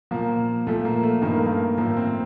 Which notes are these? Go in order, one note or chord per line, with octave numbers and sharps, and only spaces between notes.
A#2 F3 A#3
A#2 F3 A3
A#3
A3
G2 D#3 A#3
A3
A#3
A2 F3 A#3
C4